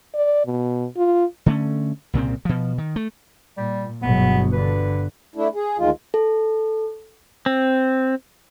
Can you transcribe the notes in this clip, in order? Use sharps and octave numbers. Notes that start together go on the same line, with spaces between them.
D5
B2
F4
D3 A3 C#4
C2 A#2 C#3 C4
B2 F3
D#3
A3
A#2 G3
G1 B2 F#3 G#3 B3
G2 D3 B4
A3 D4 E4
G#4
D2 D#3 G#3 F4
A4
C4